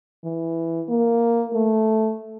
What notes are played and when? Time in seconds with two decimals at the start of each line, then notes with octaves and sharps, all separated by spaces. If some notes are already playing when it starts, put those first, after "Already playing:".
0.24 E3
0.89 A#3
1.54 A3